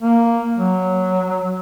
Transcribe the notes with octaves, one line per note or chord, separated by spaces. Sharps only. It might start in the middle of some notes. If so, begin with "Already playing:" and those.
A#3
F#3